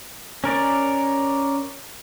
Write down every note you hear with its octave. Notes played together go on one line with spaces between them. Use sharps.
C#4 A#4 D5